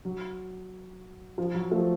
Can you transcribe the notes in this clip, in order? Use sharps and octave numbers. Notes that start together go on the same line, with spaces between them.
F#3
F3
F#3
F3 A3